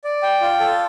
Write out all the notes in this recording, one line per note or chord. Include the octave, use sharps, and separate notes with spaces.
D5
G5
F4
A4